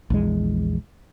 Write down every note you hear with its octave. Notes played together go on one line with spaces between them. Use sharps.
A#1 E2 G#3